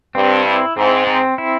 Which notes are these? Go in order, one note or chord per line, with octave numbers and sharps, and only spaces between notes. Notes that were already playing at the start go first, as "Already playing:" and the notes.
G2 C4
E4
G#2 C4
C4
E4